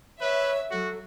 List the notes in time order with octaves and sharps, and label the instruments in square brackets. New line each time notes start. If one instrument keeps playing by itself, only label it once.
[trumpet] B4 [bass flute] C#5 [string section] E5
[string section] F#3 [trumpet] F#4 [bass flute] A4